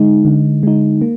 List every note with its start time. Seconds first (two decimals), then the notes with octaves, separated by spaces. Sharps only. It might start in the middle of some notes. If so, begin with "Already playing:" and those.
Already playing: D3 G#3 D#4
0.25 D3
0.63 G#3 D#4
1.01 A#3